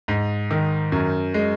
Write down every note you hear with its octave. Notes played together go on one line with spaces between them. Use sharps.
G#2
D#3
F#2
G#3